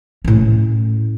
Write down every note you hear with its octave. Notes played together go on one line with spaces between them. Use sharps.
A2 C#4